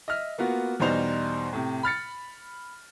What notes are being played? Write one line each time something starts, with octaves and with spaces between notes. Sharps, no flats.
D#5 E5 F6
A#3 B3 F4 F#4
E2 B2 G3 D#4 C5 F7
A2 C3
B5 F6 A6 C#7